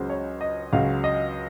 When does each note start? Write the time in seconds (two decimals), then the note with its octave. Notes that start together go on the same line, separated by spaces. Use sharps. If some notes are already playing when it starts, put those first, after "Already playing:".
Already playing: C#2 C#3 F#3 C5
0.10 C#5
0.41 D#5
0.72 C#2 C#3 F#3 F5
1.04 D#5